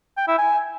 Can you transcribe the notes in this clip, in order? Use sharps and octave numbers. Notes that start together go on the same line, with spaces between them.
G5
E4
G#5